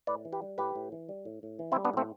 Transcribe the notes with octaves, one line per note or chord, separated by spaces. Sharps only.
A2 B4 D5
E3
G4 B4
G3
A2 G4 B4
A2
E3
G3
A2
A2
E3
C4 E4
G3
B3 D4
A2 A3 C4